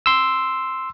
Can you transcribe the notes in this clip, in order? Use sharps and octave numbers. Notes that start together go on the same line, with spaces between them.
C6 E6